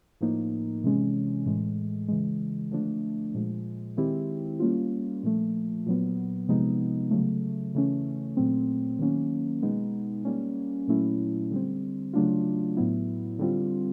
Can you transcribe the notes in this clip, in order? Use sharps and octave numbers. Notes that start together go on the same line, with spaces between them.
A2 F3 A#3 D#4
C3 E3 G#3 C#4
A2 E3 G#3
C#3 E3 G#3
D3 F3 A3 D4
A#2 F3 G#3
D#3 G#3 C4 E4 G4
G3 A#3 C#4 F4
A#2 F3 A3
A#2 F#3 B3
C3 F3 G#3 B3 D#4
C#3 F#3 A3
C#3 E3 A3 C#4
A#2 F#3 A3 C4
D#3 F#3 A#3 C#4
B2 G#3 B3 D#4
G3 A#3 C#4
A#2 F#3 A3 C#4 E4
D3 G3 C4
C#3 F#3 A3 D4 F4
A2 F#3 B3 E4
D3 G3 C4 F4